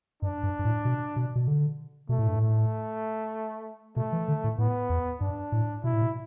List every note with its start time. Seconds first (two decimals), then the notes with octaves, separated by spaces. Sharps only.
0.22 G2 D4
0.43 G2
0.59 G2
0.65 A2
0.85 B2
1.16 B2
1.35 B2
1.48 D3
2.09 B2 A3
2.19 A2
2.28 G2
2.36 A2
2.41 A3
3.96 B2 A3
4.13 E3
4.28 D3
4.44 A2
4.58 A2 B3
4.90 E2
5.21 G2 D4
5.52 A2
5.84 B2 E4
5.93 A2
6.02 B2